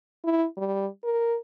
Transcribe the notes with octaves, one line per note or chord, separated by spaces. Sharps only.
E4
G3
A#4